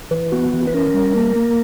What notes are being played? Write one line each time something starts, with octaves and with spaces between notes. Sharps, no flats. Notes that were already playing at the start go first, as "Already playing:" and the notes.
E3
B3 F#4
E3
B4
C#4 A#4
G3
A#3
A#3